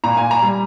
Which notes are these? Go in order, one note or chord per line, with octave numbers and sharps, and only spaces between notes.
A#2 A#5
G#5
A#5
G3